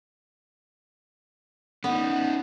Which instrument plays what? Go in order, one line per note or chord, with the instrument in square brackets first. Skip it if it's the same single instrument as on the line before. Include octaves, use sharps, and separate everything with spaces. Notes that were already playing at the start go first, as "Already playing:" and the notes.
[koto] B3 [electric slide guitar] C#4 D#4